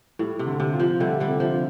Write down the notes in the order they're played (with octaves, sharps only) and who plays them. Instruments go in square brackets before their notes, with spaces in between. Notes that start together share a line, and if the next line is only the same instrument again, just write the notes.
[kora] A2 [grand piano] G3
[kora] C3
[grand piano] D3
[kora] C3
[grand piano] F4
[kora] F3
[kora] D3 G3 [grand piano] A3
[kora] D3 G3
[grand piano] C3
[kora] F3
[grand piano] F4